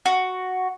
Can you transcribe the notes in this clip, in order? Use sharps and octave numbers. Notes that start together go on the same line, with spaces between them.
F#4